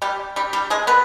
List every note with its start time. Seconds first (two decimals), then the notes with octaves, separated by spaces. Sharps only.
0.02 G3 G4
0.36 G3 G4
0.53 G3 G4
0.70 G#3 G#4
0.87 B3 B4